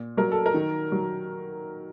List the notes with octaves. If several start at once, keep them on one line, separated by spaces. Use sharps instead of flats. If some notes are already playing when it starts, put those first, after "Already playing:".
Already playing: A#2
F#3 A#4
A4
A#4
D#3
F#3